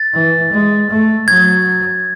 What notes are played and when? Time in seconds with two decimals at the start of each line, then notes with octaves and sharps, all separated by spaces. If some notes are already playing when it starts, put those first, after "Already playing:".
Already playing: A6
0.13 E3
0.52 G#3
0.90 A3
1.28 F#3 G#6